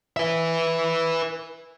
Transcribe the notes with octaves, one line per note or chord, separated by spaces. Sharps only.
B4 E5